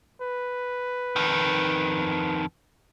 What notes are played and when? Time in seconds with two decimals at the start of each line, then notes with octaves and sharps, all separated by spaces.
0.22 B4
1.16 F2 D#3